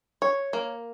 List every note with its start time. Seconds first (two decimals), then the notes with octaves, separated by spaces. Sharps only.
0.22 C#5
0.53 A#3